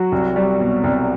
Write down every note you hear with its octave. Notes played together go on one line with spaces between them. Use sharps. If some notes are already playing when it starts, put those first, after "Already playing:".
Already playing: F#3 F#4
C2
G3
B2
C2